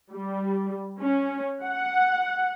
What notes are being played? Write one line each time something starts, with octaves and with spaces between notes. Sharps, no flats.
G3
C#4
F#5